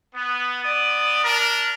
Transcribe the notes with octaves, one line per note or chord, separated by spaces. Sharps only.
B3
B3 D5 D#6
D4 A#4